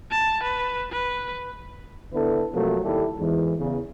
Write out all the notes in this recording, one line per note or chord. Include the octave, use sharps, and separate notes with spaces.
A5
B4
B4
D3 B3 E4 A4 B4
C3 F3 F#3 A3 A#3
D#2 G3 E4 G4 A4
E2 G#2 E3
E2 C#3